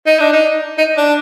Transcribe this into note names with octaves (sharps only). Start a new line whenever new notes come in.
D#4
D4
D#4
D#4
D4